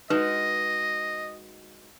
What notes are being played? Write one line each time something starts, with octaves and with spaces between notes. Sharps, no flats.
G#3 D#4 F#4 B4 D#5